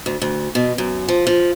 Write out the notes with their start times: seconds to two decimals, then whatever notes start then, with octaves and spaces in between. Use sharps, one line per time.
0.06 D2
0.22 D2
0.55 B2
0.78 F#2
1.09 F3
1.27 F3